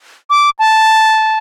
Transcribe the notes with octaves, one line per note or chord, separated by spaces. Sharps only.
D6
A5